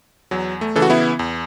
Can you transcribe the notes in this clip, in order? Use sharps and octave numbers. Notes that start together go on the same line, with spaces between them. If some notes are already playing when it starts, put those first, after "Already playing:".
E2 F#3
A3
C#3 E3 A4
F#4
B3 E4
E2